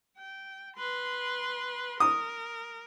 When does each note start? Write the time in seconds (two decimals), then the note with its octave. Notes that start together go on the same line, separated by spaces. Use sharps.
0.18 G5
0.76 B4 C6
2.00 A#4 D#6